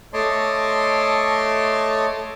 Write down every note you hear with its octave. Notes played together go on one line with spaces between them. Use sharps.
A3 C#5 D#5 A5 C6 D6